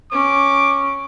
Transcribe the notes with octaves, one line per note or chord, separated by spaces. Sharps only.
C#4 D6